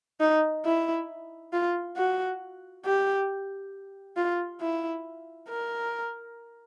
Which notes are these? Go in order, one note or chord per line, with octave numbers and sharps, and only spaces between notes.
D#4
E4
F4
F#4
G4
F4
E4
A#4